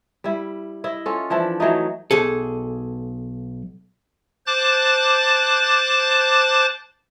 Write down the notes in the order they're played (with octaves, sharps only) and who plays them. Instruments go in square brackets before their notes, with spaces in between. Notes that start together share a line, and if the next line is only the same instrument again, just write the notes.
[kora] G3 E4
E4 D#5
C#4 F4 A4
E3 F3 D4 E4
E3 F#3 A3 D#4
[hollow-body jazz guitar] B1 G#4 A4
[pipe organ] C5 A5 D6 F#6 A6